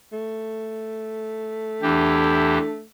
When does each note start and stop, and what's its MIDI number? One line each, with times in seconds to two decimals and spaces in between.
0.13 2.84 57
1.82 2.58 40
1.82 2.58 52
1.82 2.79 62
1.82 2.58 67